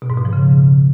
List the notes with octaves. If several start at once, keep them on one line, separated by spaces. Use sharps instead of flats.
B2
G#2
B2
F3
C#3